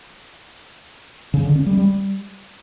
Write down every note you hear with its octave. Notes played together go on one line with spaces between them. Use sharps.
C#3
D3
C#4
G3
G3